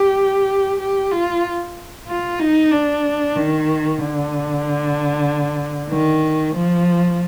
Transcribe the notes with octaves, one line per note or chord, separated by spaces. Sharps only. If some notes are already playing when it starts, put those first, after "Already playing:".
Already playing: G4
G4
F4
F4
D#4
D4
D#3
D3
D#3
F3